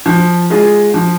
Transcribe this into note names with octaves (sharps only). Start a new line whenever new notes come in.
F3
G#3 F4 G#4
F3